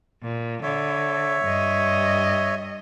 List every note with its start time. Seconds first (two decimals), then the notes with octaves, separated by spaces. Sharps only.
0.23 A#2
0.63 D3 C#5 E5
1.45 G2 D#5